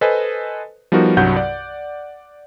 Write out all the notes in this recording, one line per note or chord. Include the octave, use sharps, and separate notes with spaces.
A4 B4 C5 D#5 G#5
F3 G3 B3 D#4 F#4 A#4
C2 G2 F#3 F#5 G6
D5 F#5